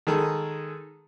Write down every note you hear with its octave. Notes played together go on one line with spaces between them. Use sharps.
D#3 G#3 G#4 A4